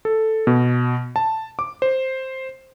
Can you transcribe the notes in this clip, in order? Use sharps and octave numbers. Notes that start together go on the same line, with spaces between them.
A4
B2
A5
D6
C5